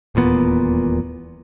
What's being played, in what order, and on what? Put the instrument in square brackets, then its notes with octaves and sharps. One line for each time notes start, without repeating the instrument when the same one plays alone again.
[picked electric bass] D#1 E2 A#2 B3